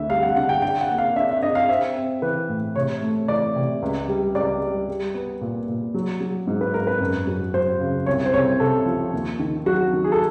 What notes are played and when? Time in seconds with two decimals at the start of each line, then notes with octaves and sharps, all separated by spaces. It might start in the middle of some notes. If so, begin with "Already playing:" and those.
Already playing: D2 D3 E5
0.10 G3 F5
0.23 F#5
0.36 D3 F#5
0.49 G5
0.62 D4 G5
0.81 F#5
0.90 A#3
0.98 F5
1.16 D4 E5
1.29 E5
1.42 D4 D#5
1.55 F5
1.69 C4 E5
1.95 C4
2.22 E3 B4
2.49 A2
2.76 C3 C#5
3.02 A3
3.28 E3 D5
3.56 C3
3.82 C#2
4.08 G3
4.35 C#2 D5
4.61 G3
4.89 G3
5.14 B3
5.41 A#2
5.68 A#2
5.94 F#3
6.21 F#3
6.47 G#2
6.61 B4
6.74 G#2 A#4
6.87 B4
7.00 F#2
7.27 F#3
7.54 F#3 C5
7.80 C#3
8.06 C2 C#5
8.26 C5
8.34 C2 C#5
8.60 C3 A4
8.86 F3
9.13 D#2
9.39 D#3
9.66 F#3 F#4
9.93 D#3
10.04 G#4
10.12 A4